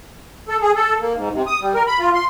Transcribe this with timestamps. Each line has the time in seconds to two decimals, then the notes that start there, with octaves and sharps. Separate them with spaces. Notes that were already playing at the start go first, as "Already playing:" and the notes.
0.48 A4
0.61 G#4
0.75 A4
1.00 A#3
1.14 G#2
1.33 C3
1.47 D#6
1.61 G3
1.74 A#4
1.87 B5
1.99 F4
2.14 C6